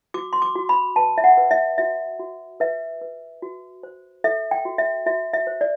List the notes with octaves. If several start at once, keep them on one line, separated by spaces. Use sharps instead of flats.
F#4 D6
C6
D6
F#4
B5
B4 A5
E5
F#5
B4
E5
F#4 E5
F#4
B4 E5
B4
F#4
C5
A4 E5
G5
F#4
E5
F#4 E5
E5
C5
D5